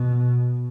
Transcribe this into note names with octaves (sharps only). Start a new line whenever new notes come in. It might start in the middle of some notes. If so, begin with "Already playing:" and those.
Already playing: B2